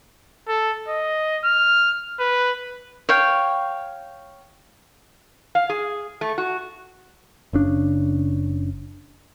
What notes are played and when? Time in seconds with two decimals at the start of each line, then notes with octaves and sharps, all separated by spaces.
0.48 A4
0.88 D#5
1.44 F6
2.20 B4
3.09 C#5 F5 G5
5.55 F5
5.69 G#4
6.21 A3
6.38 F#4
7.53 F#1 C#3 D4